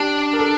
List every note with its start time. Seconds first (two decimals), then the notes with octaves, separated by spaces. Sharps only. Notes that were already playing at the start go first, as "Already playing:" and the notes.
Already playing: D4 G4
0.33 A#4
0.39 A4